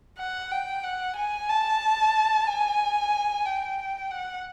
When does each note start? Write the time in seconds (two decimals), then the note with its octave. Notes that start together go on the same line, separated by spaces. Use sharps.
0.18 F#5
0.51 G5
0.83 F#5
1.16 G#5
1.49 A5
2.47 G#5
3.45 G5
4.11 F#5